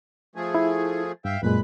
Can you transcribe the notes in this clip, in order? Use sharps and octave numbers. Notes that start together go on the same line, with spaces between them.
F3 A3 G#4
E4
G2 E5 F5 G5
F#2 A#2 G#3 B4 B5